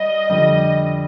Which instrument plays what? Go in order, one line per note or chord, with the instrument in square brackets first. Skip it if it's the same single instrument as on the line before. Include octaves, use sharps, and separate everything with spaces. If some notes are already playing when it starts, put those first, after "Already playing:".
Already playing: [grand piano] G3 [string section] D#5
[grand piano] F2 D3 G3